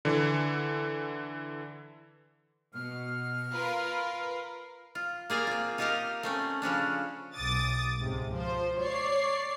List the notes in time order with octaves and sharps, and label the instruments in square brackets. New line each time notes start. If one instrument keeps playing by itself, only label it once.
[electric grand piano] D3 E3
[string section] B2 [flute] F6
[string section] F4 A#4 B4
[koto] F4
A#3 G#4 D5 F5
C4 F4
D#4 F4 G4 A#4 D#5 F5
A3 C4 C#4
C#3 F3 C#4 D4
[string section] B1 D6 D#6 A6
C#2 G#2 C3
F3 C5
C#5 D5 C7